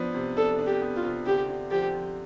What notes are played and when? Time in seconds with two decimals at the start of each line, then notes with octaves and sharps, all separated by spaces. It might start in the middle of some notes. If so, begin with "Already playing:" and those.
Already playing: F3 B3 D4
0.14 C3
0.37 D4 A4
0.59 D4
0.67 G4
0.82 B3
0.96 F4
1.04 C3
1.26 D3 G4
1.48 D3
1.71 F3 G4
1.94 F3